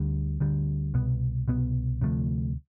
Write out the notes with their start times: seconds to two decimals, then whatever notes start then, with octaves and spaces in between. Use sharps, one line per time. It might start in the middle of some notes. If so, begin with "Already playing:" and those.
Already playing: D2 D3 G3
0.40 D2 D3 G3
0.94 C2 B2 B3
1.48 C2 B2 B3
2.01 D2 C3 F3 A3